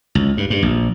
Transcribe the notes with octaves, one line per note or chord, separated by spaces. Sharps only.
C#2
G2
G2
A#1